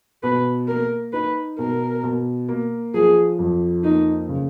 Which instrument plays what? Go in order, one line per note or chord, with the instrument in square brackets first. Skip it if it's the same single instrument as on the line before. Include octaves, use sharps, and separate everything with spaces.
[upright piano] B2 [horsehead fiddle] B4
[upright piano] A#3 [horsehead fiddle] A#4
[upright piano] D#4 [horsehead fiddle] B4
[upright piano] B2 [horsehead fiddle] A#4
[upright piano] B2
A#3
[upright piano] F3 [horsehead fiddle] G#4
[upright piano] F2
[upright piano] A#3 [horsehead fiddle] D#4
[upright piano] C#3